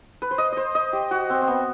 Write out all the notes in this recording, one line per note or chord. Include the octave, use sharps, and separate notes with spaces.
B4
C5
D#5
C5 D#5
D#5
G4
F#4
C4
C4
B3